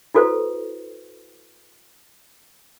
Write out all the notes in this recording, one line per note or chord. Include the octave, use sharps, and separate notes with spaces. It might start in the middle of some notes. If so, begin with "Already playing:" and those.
E4 F#4 A4 B4 C5